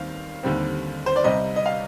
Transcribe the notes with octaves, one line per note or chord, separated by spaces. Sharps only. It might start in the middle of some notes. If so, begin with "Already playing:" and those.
Already playing: D#2 D#3 G3 C4 F5
D#2 D3 G3 C4
C5
D5
C2 C3 G3 C4 D#5
D#5
F5